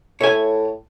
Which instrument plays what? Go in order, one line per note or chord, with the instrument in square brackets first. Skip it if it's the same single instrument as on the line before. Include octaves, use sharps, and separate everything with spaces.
[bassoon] A2 [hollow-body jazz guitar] C#5 E5 G#5